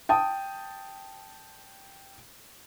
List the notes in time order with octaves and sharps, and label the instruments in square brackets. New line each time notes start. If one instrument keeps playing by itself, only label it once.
[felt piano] G5 A5 D#6